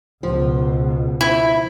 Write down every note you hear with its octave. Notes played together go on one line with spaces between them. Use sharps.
C#2 B2 F3
E4